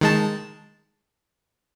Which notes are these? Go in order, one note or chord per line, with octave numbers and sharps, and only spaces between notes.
D#3 G#3 A5